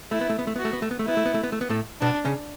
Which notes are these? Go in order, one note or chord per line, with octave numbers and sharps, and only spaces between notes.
A3 E4
B3
A3
B3
A3
B3 F#4
A3
B3
A3
B3
A3
B3 E4
A3
B3
A3
B3
A3
B3
A2 A3
B2 B3 D4
C#3 C#4